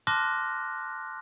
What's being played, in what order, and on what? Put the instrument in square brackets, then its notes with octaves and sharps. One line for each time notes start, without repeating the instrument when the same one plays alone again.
[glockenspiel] A5 C6 D6 F6 F#6 A#6